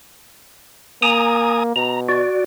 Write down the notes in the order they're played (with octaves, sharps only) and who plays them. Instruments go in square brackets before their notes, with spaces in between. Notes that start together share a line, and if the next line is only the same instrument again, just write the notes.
[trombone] A#3 [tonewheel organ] G#5 A#5 D#6
[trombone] B2 [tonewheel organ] A#5
[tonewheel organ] F#4 D5